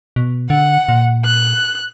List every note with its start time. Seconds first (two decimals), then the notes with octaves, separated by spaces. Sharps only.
0.16 B2
0.50 D3 F#5
0.89 A#2
1.25 F#6